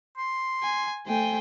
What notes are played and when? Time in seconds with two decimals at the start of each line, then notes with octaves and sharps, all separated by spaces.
0.17 C6
0.63 G#5
1.07 A3 C5 G5 G#5